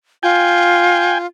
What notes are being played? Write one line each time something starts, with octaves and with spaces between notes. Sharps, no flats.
F4 G5 G#5